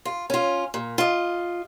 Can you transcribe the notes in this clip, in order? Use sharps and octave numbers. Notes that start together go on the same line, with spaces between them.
F4
C#4 F4
A#2
F4 D#5